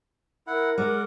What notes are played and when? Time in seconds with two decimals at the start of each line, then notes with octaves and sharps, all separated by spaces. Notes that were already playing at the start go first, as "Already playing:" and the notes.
0.47 E4 A#4 F#5
0.78 G#3 D5 F#5